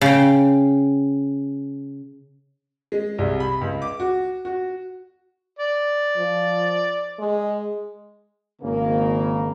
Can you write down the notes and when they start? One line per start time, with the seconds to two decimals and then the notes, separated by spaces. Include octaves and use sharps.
0.01 C#3 G5
2.92 G#3
3.18 C2
3.40 B5
3.61 C#2
3.82 D6
4.00 F#4
4.45 F#4
5.59 D5
6.16 F3
7.19 G#3
8.62 G#1 C#3 A#3